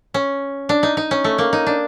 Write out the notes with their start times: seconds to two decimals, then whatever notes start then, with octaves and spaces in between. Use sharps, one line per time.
0.14 C#4
0.69 D4
0.83 D#4
0.97 D#4
1.11 C#4
1.24 A3
1.38 A#3
1.53 D#4
1.66 D4